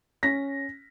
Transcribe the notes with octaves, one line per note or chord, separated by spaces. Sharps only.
C#4 A#6 B6